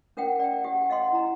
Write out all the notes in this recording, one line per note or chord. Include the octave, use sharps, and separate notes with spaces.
C#4 A#4 F#5 G5
D5 G5
G4 F#5
D#5 F5 F#5 C6
E4 A#5